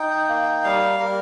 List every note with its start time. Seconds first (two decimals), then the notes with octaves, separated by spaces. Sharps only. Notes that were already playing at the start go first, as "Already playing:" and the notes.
Already playing: D#4 G5
0.29 A#3
0.64 G3 F5
1.00 G3 A#4